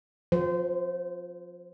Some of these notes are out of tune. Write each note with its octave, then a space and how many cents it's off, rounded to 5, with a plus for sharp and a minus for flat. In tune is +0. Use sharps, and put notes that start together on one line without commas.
F3 +25 C5 -30